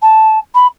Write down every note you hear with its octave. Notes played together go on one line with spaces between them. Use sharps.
A5
B5